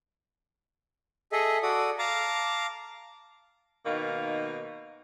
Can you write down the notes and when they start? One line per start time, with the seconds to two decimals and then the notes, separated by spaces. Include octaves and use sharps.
1.32 G#4 A4 D#5 E5
1.63 F#4 A4 D5 D#6
1.99 F5 A5 A#5 D6
3.85 B2 D#3 A#3 D#4 F5